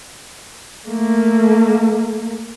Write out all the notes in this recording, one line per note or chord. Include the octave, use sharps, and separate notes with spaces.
A3 A#3